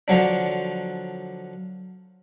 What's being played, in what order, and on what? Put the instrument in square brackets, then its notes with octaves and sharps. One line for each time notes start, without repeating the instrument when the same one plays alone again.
[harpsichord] D3 F3 F#3 D4